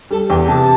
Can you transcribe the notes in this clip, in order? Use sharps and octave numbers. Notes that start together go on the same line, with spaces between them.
G3 A4
E2 G5
C3 A5